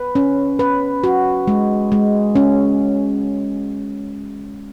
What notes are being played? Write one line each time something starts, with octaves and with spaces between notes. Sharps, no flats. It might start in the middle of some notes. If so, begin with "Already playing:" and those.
Already playing: B4
C#4
B4
F#4
G#3
G#3
C#4